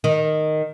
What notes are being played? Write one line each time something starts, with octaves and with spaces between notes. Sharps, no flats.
D#3